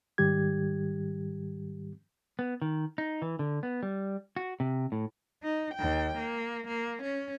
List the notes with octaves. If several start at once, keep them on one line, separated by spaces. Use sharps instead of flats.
G#2 D#3 G3 G4 G#6
B3
D#3
D#4
E3
D3
B3
G3
F#4
C3
A2
D#4
D#2 G5
A#3
A#3
C#4